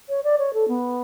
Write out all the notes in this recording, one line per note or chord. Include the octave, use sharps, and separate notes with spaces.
C#5
D5
C#5
A4
B3